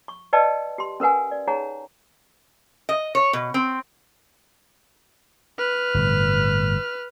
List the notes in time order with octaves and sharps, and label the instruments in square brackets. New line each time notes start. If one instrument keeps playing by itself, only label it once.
[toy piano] C#6
B4 D5 D#5 G5 A5 E6
G4 C6
C#4 A#4 B4 F#5 G#5
D5
D#4 G#4 C#5 F#5 A#5
[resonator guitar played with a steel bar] D#5
C#5
B2
C4
[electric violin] B4 F6
[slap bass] G1 A2 C3